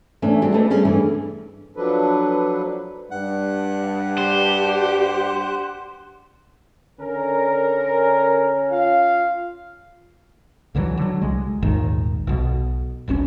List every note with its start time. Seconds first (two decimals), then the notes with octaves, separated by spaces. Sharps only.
0.22 E3 A3 C#4 D4
0.42 G3 G#3 D4 F#4 G4
0.54 A3 A4 B4 D#5
0.70 G3 C#4 G#4 G#5
0.85 G2 E3 A3
1.76 F3 F#3 D4 A4 B4
3.11 G2 G3 D4 F#5
4.18 G4 C5
7.00 D3 C#4 A#4
8.70 F4 F5
10.74 C#2 D3 E3 F#3
10.97 D3 F#3
11.22 C2 G#3
11.62 A#1 D#2 G#2 D#3
12.27 B1 B2
13.08 E1 B1 C#3 C#4